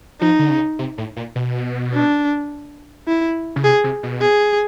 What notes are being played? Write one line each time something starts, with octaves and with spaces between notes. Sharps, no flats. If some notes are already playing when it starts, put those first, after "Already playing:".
F3 D#4
D3
C#3
C3
A2
A#2
B2
D4
E4
C#3
C3 G#4
C3
B2
G#4